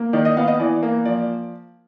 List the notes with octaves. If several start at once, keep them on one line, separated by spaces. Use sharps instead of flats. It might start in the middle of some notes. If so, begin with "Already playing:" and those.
Already playing: A#3
D#3 D5
D#5
B3 F5
D#5
E3 D5
A#3
F3 D5